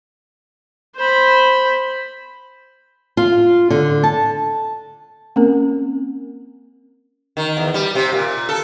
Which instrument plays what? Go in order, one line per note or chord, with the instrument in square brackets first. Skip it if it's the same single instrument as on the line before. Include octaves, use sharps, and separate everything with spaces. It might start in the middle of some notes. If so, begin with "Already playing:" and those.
[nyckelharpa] C5 B5
[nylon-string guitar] F4
D3
A5
[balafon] A#3 C4 C#4 A#4
[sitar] D#3
E2
G3
C3
A#2
A4